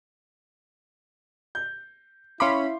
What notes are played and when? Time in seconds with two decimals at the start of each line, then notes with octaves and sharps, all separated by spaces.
1.55 G6
2.40 C#4 E4 F5 B5 C6 D6